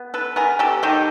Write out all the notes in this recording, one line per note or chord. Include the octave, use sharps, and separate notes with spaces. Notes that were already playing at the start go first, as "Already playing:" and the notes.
Already playing: B3
A4 B4
B3 G#4 A#4
G4 A4
D#3 G4 A4